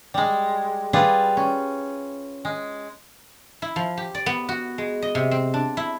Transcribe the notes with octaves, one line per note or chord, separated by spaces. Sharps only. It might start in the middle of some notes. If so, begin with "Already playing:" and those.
G3 G#3
G3 F4 G#4 B4
C#4
G#3
E4
F3
G4
D5
B3
F#4
G#3
D#5
C3
C4
D4
E4